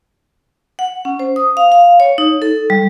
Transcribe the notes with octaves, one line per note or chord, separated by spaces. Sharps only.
F#5
C#4
C5
D#6
F5
F5
C#5
D#4
A4
G3